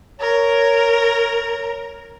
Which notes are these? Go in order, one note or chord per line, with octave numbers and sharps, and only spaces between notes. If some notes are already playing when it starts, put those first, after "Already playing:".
A#4 C#5